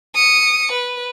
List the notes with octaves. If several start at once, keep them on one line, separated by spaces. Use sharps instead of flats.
D#6 C#7
B4